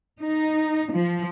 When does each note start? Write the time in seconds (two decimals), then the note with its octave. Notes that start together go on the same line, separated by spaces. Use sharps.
0.21 D#4
0.93 F3